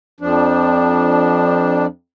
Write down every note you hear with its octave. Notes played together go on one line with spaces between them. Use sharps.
F2 F3 D4